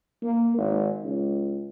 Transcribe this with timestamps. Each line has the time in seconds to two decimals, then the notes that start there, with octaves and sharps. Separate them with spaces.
0.23 A#3
0.58 G#1
1.05 C#2